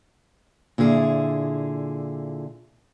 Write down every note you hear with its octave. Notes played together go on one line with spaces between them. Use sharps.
A#2 D3 E4 G#4